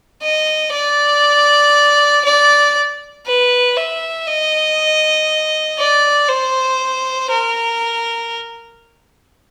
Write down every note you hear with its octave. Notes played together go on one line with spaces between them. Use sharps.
D#5
D5
D5
B4
E5
D#5
D5
C5
A#4